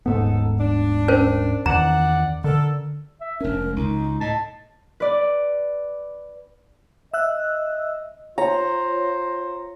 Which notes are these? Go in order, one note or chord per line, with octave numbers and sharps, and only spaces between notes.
D#1 G#2 C#3 B3 D#4 A4
D4
C#4 A#4 C5
E2 D#3 D5 F#5 A#5
D3 A4 A#4
E5
F1 C#4 D4 A#4
G#3
C#2 D#4
A2 D#5 A5
B4 D5
D#5 E5 E6 F#6
F4 C5 C#5 A#5